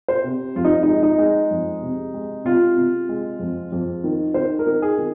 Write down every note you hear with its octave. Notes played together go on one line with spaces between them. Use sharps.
C5
C3
F2 F4
D#4
G#3 D#4
D#4
G#3
F2
C3
G#3
C3 F4
C3
G#3
F2
F2
D#3
D#3 C5
A#4
D#3
G#4
D#3